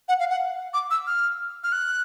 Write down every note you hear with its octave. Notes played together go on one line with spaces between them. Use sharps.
F#5
F5
F#5
D6
E6
F6
F6
F#6